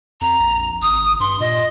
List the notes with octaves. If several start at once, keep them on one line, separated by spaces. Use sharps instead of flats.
F2 A#5
A#1
G#1 D#6
G2 C6
A#2 D#5